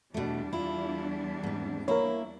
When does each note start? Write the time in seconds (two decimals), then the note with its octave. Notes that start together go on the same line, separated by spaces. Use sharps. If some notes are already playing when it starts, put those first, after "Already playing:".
0.14 E2 B2 G3 A3 D4
0.53 E4 F4
1.43 G#2 C4
1.88 A#3 E4 A#4 C#5